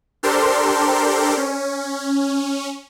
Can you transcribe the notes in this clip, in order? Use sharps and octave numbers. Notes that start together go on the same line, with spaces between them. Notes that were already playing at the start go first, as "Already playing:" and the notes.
D4 G4 A4 A#4 C5 C6
C#4